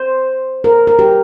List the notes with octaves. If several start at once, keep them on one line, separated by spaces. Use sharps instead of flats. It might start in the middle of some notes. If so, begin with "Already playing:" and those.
Already playing: C5
A#4
A#4
G4